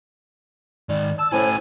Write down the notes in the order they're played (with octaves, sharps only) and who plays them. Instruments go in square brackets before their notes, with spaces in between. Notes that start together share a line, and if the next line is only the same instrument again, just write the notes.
[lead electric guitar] G#2 D#3 [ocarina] D5
[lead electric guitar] A5 [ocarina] E6
[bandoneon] A2 G#5 [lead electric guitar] C#4 E4 [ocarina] C5